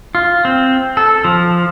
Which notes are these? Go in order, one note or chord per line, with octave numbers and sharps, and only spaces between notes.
F4
C4
A4
F3